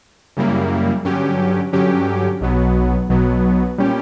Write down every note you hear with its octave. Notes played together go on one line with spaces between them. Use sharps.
F#2 C#3 G3 A#3 E4
G2 D3 F#3 C#4 G4
G2 D3 F#3 C#4 G4
B1 B2 F#3 B3
B1 B2 F#3 B3
A#2 G3 C#4 G4